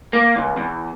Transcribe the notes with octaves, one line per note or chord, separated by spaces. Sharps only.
A#3
C#2
E2